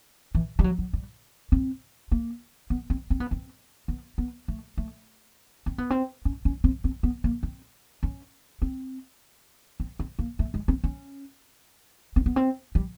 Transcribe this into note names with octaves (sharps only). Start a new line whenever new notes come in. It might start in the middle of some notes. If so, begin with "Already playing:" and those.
E3
G3
F#3
F#3
G3
C4
A#3
B3
C4
C4
B3
C4
B3
B3
A3
A3
C4
B3
C4
C#4
C#4
C4
C4
B3
A#3
C4
C#4
C4
C4
C4
A#3
A3
G#3
C4
C#4
C4
B3
C4
G3